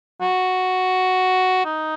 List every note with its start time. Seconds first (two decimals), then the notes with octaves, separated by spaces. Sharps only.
0.21 F#4
1.65 D#4